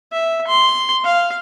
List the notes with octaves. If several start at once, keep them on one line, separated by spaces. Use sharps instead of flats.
E5
C6
F5